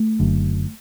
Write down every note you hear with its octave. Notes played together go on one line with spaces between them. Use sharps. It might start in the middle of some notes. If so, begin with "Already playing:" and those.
Already playing: A3
F#1 F#2 D3